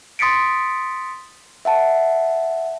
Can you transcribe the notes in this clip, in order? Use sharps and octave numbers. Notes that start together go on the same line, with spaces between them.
C6 D#6 A6 B6 C#7 D7
E5 F#5 A5